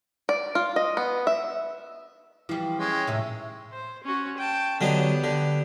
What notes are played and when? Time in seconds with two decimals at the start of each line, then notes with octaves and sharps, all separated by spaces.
0.29 D5
0.55 F4
0.76 D#5
0.97 B3
1.27 E5
2.49 E3 F3 G3
2.78 G#3 C#4 G5
3.07 D#2 A2 C3
3.72 C5
4.04 C#4 F#4
4.37 G5 A5
4.81 D3 F#3 B3 D#4 G4
5.24 D3